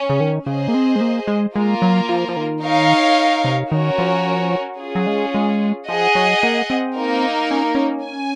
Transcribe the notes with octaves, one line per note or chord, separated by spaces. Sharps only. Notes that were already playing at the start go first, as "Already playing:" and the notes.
Already playing: C#4
C#3
D#3
C#3 G#4 C5 D#5
A#3
C4
G#3
A#3
G#3
G#3 A#3 F4 A#4
F#3
F3
F3
D#3
D#4 A#4 C#5 F5
C3
D#3 C#4 F#4 A#4 C#5
F3
C#4 F4 G#4
F#3
G#3
G#3
F3 G#4 D#5 F#5
F#3
A#3
C4
A#3 D#4 A#4
C#4
C#4
G#5